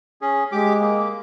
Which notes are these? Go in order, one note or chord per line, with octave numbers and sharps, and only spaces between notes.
C#4 G#4
G#3 G4 D6
A#3